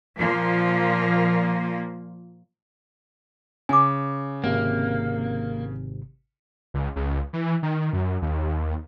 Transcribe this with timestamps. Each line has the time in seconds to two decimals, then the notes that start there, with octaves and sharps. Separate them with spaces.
0.19 A#2 F3 A#3
3.69 C#3 G#5 D6
4.44 G#1 C3 A#3
6.74 C#2
6.96 C#2
7.33 E3
7.63 D#3
7.93 F#2
8.22 D#2